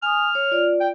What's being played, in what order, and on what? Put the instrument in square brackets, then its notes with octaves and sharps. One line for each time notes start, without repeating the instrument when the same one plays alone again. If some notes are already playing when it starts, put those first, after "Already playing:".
[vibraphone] G#5 D#6 [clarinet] F6
[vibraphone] C#5
F4 D5
[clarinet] G5